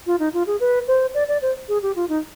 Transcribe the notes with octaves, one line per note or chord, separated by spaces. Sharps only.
F4
D#4
F4
G#4
B4
C5
D5
D5
C5
G#4
G4
F4
D#4